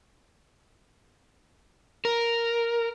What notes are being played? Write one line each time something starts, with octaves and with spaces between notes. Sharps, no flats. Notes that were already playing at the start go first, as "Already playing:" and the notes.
A#4